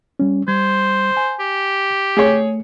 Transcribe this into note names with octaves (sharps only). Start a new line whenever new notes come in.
G3 C#4
G3 C5 G#6
G#5
G4
A3 G#4 C#5